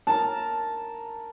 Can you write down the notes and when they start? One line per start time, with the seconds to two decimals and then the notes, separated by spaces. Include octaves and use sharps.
0.07 A#4 A5